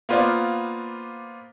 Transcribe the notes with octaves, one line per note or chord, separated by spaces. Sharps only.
A#3 B3 F4 C5 D5